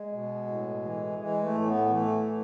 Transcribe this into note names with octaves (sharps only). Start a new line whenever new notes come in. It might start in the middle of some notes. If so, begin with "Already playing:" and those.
Already playing: G#3
B2
A2
E3
E3 G#3
A3
A2
B3
E3 A3
A2